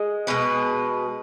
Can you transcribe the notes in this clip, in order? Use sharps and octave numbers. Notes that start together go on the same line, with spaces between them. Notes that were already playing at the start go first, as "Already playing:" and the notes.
Already playing: G#3
B2 G#3 B4